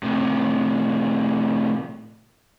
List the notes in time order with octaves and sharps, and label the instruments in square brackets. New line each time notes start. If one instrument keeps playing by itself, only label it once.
[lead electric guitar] A2 C3